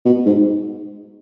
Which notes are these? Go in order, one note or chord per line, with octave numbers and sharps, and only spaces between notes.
B2
G#2